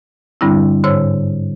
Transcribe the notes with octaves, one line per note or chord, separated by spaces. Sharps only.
G2 D3 G3 C4 D4 E4
G#2 D3 C5 C#5 E6